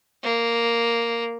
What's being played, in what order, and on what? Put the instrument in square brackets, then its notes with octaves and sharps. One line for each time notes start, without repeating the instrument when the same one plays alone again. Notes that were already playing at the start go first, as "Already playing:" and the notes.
[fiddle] A#3